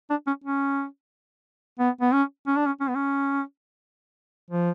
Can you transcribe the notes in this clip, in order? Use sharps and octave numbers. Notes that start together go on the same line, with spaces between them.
D4
C#4
C#4
B3
B3
C#4
C#4
D4
C#4
C#4
B3
C#4
F3